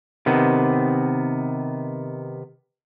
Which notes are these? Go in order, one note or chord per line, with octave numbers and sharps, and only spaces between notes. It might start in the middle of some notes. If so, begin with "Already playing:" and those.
C3 D#3 B3